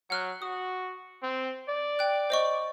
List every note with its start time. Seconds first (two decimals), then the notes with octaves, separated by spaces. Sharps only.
0.10 F#3 F#5 F6 F#6
0.42 F#4 D#6
1.23 C4
1.69 D5
1.99 G5 F#6
2.30 C5 D#5 C#6